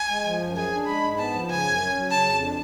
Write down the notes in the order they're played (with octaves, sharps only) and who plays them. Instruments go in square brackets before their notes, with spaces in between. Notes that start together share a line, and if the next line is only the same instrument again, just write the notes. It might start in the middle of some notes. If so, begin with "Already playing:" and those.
Already playing: [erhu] G#5
[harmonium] G#3
F3
F#2
[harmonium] G#4 [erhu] G#5
[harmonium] D4
[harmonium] G#3 [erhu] B5
[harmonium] G#2
[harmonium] B3 [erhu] A5
[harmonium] F3
[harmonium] C#3 [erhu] G#5
[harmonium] F#2
C#4
F#3
[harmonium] C#3 [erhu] A5
[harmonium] F2
D4